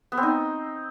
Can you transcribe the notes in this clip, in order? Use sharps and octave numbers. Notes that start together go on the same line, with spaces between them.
B3
C4
D#4